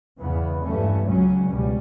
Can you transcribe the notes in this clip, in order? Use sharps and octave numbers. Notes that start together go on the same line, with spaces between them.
E2 C#3 E3 B3
G2 E3 A3 C#4
C#2 C#3 F#3 C#4
C#2 B2 G3 C#4